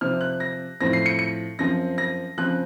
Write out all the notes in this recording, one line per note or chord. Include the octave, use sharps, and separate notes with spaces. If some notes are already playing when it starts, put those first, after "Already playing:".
C3 F3 C4 F6
F#6
A#6
A2 F3 C4 A#6
C7
C#7
C#7
F#2 F3 C4 A#6
A#6
C#3 F3 C4 F#6